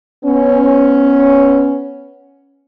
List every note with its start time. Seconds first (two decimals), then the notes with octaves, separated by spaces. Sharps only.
0.25 B3 C#4